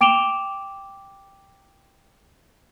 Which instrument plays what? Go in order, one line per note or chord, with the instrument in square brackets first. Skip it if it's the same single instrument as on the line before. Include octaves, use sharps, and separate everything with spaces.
[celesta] G5 D6 D7 E7 F7 G7